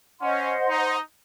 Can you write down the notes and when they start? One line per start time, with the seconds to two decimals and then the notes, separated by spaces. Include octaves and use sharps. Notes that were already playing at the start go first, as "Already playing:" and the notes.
0.21 C#4 C5 D#5 F#5 C6
0.68 D#4